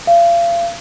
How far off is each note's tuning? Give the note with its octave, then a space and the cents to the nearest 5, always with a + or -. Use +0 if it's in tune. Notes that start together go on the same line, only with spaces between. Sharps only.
F5 -35